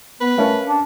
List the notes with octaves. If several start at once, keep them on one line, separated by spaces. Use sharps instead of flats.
B3 B4
A3 C#4 A#4 F5
D4